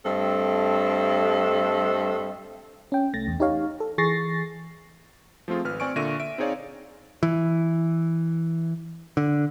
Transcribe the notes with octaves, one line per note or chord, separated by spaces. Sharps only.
G2 A3 C4 A4 D#5
C#4 G5
C2 A3 A6 A#6
E2
D#4 G4 C#5 F5
A4
E3 G#4 C#6 A6 A#6 C7
F3 A3 C4 F4 G#4
G#1 B4 F6
C4 D5 G#5 C#6 D7
A#2 D3 E5 C#6 A#6 D#7
E5 D7
C4 D#4 G#4 C#5 D5 F5
E3
D3